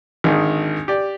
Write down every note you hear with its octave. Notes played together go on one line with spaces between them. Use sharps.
G#1 D3 D#3
G4 D5